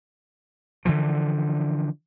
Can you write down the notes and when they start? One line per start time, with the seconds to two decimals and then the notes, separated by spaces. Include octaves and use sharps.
0.85 D3 E3 F3